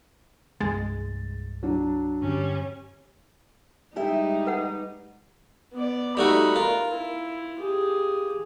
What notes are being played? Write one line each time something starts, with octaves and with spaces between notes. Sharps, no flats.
C2 G2 G#3 A6
F#3 D4
G2 D3 G3 C#4
G3 G#3 D#4 E4 G4 E5
B4 F#5
B3 D5
G3 A3 D#4 F#4 B5
F4 A#4
E4
G4 G#4